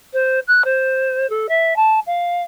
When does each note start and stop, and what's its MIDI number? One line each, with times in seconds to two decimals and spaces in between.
0.13 0.40 72
0.47 0.64 90
0.64 1.28 72
1.29 1.47 69
1.49 1.76 76
1.76 1.99 81
2.06 2.43 77